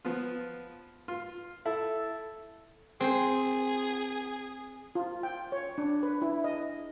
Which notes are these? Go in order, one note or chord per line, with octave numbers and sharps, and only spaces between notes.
F3 B3 F4
F4
E4 A4
C4 G#4 C5
F4
G5
C#5
D4
B4
E4
D#5